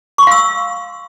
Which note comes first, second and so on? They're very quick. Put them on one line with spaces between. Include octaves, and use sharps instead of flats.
C#6 C6 F5 E6